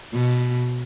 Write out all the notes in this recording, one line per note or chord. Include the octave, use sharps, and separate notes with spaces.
B2